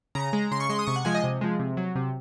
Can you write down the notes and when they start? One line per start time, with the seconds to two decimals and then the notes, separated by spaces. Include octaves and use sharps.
0.15 C#3 A#5
0.33 G#3
0.51 C#3 C6
0.60 C#6
0.70 G#3 C6
0.79 D#6
0.87 C3 C#6
0.96 F#5
1.05 F3 G#3 G#5
1.15 D#5
1.24 C3
1.41 F3 G#3
1.59 C3
1.77 F#3
1.95 C3